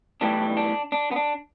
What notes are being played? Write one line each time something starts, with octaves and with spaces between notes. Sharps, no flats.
B1 A2 E3 G3 D4
D4
D4
B3
D4